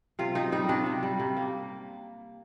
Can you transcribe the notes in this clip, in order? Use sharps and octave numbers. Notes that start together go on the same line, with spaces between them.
C3 F4
C3 D#4
G3 D#4
C3 D4
C3
G3
C3
A#3